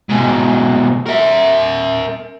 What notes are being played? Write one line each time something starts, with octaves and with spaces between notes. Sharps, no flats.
G#2 B2
A#4 E5